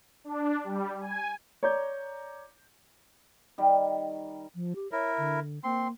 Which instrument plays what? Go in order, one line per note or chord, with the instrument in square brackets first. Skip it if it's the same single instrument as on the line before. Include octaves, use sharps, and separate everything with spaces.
[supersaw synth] D4
G3
G#5
[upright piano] C#5 D5 A#5 D6 G6
[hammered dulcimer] D#3 G3
[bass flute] F3
G4
[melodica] E4 A#4 [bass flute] C#5
[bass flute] D3
[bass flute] A#3 [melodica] C4 C6